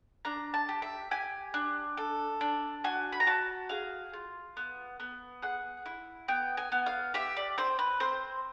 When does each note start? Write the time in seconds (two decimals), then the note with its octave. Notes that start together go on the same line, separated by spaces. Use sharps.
0.25 D4 A#5
0.54 A5
0.69 G4
0.82 E5
1.11 G4 G#5
1.54 D4
1.97 A4
2.41 D4
2.84 F#4 G#5
3.12 B5
3.20 A#5
3.27 F#4 A5
3.69 G#4 F5
4.13 F4
4.57 B3
5.00 B3
5.42 G#4 F#5
5.86 E4
6.28 B3 G5
6.57 G#5
6.72 B3
6.86 F5
7.14 G4 E5
7.37 D5
7.58 C4 C5
7.79 B4
8.00 C4 C5